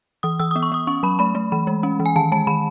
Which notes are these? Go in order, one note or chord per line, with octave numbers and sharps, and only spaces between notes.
E3 D#6
E3 E6
B3 D#6
C#6
B3 D#6
C#4 C#6
F#3 B5
A3 B5
A3
E3 B5
G#3
C#4
E3
G#5
D#3 A5
G#3 A5
D#3 B5